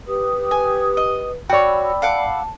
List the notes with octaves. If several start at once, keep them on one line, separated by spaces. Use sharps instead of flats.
G4 B4 D#6
G#5
D#5
F#4 C#5 D5 G5 B5 E6
F5 F#5 A5 D6